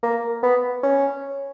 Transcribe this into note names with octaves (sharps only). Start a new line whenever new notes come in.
A#3
B3
C#4